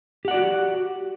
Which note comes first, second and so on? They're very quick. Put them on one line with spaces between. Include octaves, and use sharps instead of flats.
G4 F#5 D5 F#4